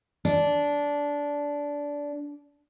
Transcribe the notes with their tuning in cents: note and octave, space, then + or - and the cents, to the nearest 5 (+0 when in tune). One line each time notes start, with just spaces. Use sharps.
D4 -15